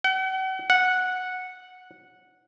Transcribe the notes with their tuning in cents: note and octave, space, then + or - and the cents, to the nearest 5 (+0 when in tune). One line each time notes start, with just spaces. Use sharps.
F#5 +40
F#5 -10